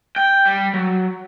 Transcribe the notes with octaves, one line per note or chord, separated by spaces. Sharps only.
G5
G3
F#3